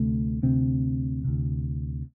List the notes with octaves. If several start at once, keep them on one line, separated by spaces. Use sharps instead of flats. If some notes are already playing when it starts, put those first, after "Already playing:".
Already playing: D2 C3 A3
D2 C3 C4
D2 C3